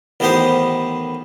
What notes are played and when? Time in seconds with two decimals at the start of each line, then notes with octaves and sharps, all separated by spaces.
0.20 A1 D#3 B3 D#4 G4 C5